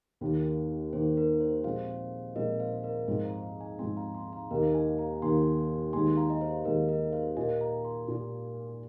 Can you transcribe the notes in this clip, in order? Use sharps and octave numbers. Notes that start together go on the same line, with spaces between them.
D#2 D#3 A#3 A#4
D#2 D#3 A#3 C5
A#4
C5
A#2 F3 G#3 C4 C5 F5
A#2 F3 G#3 C4 A#4 D#5
C5 F5
A#4 D#5
G#2 F3 C4 C5 F5
F5 A#5
F5 A#5
D#5 G#5
G#2 F3 C4 G#5 C6
F5 A#5
G#5 C6
F5 A#5
D#2 D#3 A#3 A#4 D#5
D#5 G#5
F5 A#5
D#2 D#3 A#3 G#5 C6
D#2 D#3 G#3 G#5 C6
F5 A#5
D#5
C5 F5
D#2 D#3 G#3 A#4 D#5
A#4 D#5
C5 F5
A#2 A#3 F4 A#4 D#5 G#5
F5 A#5
G#5 C6
A#2 A#3 F4 A#4